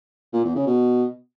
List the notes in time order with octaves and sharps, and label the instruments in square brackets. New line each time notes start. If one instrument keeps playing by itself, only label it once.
[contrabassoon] A#2
E2
C#3
B2